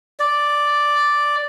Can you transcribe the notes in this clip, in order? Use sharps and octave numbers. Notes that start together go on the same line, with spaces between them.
D5